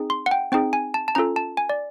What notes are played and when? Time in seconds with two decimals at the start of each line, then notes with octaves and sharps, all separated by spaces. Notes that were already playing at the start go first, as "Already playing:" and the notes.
Already playing: C4 D#4 G#4
0.10 C6
0.26 F#5
0.31 G5
0.52 C4 D#4 G#4 G5
0.73 G#5
0.94 A5
1.08 A5
1.15 C#4 F4 A4 A#5
1.36 A5
1.57 G#5
1.69 D5